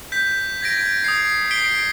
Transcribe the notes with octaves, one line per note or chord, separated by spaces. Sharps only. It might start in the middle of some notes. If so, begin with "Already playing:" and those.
G6 B6
G#6 A#6 D7
D#6 G#6 C7
B6 C7 D7 G7